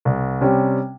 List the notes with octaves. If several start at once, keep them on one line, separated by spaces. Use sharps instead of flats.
C2
C3 G3 C#4